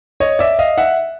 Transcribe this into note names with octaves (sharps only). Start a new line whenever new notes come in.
C#5 D#5
D5 E5
D#5 F5
E5 F#5